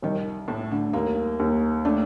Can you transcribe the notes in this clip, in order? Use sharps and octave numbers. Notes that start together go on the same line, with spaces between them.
C2 D#3
A2 A3
D3
D#2 A#3
D#2
A3 D4